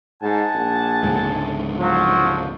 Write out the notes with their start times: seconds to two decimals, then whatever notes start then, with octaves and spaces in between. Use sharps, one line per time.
0.22 G#2 F#5 G#5 A5
0.55 A#1
1.03 C#2 G#2 D3
1.79 F3 F#3